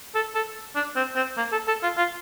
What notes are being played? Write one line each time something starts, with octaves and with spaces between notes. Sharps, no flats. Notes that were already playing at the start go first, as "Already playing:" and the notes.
A4
A4
D4
C4
C4
A#3
A4
A4
F4
F4